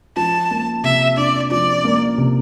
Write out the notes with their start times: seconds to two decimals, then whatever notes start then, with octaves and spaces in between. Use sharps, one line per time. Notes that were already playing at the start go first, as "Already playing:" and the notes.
0.17 F3 A5
0.51 A#3
0.84 C3 E5
1.17 D4 D5
1.51 F3 D5
1.84 A#3
2.18 C3